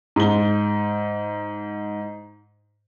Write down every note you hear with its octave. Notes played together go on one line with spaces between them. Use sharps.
G#2 G7